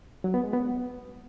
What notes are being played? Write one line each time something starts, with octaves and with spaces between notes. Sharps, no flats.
F#3
B3
G#3
B3